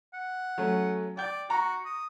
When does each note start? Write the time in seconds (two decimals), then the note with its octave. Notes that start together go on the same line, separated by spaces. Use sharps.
0.14 F#5
0.58 F#3 A3 C#4
1.17 D5 G5 G6
1.50 F#4 A#5 C#6
1.85 D#6